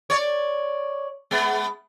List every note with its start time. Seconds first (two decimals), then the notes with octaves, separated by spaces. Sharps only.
0.10 C#5 D5
1.31 G#3 B3